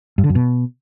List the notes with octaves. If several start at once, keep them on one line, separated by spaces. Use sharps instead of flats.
G2
D3
F#2
B2